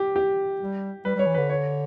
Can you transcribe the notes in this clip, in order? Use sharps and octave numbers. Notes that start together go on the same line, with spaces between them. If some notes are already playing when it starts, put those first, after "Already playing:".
Already playing: G4
G4
G3
G3 B4
G3
C#5
E3
D3 B4
C#5